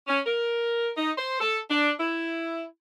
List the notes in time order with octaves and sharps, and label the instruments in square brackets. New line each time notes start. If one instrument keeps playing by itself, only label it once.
[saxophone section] C#4
A#4
D#4
C5
A4
D4
E4